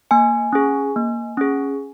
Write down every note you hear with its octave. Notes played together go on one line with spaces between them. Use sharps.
A#3 G#5
C#4 G#4
A#3
C#4 G#4